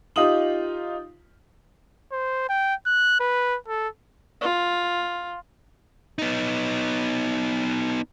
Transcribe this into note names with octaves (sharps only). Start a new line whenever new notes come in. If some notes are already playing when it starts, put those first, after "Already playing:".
D#4 F4 G4 D#6 F#7
C5
G5
F#6
B4
A4
F4
B3 D#4